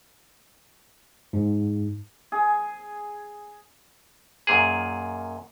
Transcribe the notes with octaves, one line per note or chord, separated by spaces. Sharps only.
G#2
G#4
F#2 A#2 G#4